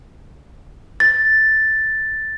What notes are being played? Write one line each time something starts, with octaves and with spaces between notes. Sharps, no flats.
A6